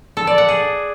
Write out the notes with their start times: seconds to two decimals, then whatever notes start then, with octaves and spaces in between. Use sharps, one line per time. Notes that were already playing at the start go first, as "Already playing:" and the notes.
0.17 A4
0.27 D5
0.38 F#5
0.48 G#4